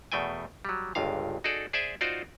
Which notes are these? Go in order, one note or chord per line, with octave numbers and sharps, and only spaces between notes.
E2 B2 A3 G5 G#5
F#3 G3
G1 C#2 G2 F5
D#4 F#4 G#4 A4 D5
G#4 C5 D5 E5 G#5
D#4 F4 F#4 C5 D5